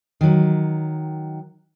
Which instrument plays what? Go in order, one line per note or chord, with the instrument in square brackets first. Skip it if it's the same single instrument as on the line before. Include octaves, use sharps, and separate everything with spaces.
[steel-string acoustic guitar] D#3 F#3